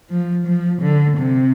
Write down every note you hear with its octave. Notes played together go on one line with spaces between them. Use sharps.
F3
F3
D3
C3